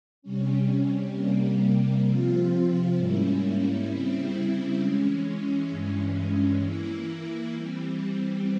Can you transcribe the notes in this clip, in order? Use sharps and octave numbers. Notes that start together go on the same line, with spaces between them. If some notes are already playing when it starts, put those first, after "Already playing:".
C3 G3 C#4
C3 G3 A#3
C3 F3 C4 F4
G#2 G3 A#3 C#4 E4
C#3 G3 C4 E4
E3 G#3 C#4
G2 E3 G#3 C#4
E3 A#3 E4
E3 G3 C4